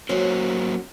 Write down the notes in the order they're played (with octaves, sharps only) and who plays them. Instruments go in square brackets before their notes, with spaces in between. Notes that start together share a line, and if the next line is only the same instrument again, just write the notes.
[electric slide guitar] F#3 A#3 C5 [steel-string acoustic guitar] C#4 F#4 A#4